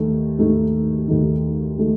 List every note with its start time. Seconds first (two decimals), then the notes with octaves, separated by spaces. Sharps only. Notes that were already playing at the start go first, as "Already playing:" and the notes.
Already playing: D#2 D#3 A3 D#4
0.39 D#2 D#3 A3 D#4
1.08 D#2 D#3 A3 D#4
1.78 D#3 A3 D#4